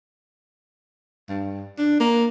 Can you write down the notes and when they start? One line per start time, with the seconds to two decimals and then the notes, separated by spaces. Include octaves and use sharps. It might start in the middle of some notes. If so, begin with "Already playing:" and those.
1.29 G2
1.78 D4
2.00 A#3